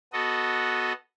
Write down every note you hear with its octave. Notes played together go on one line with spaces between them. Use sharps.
B3 F#4 A4 D#5